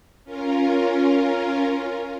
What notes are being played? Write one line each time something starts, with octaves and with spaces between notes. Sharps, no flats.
C#4 F4 A#4